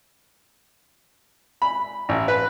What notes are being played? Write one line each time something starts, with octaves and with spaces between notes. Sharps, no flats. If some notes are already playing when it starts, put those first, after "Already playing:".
B5
A1
B4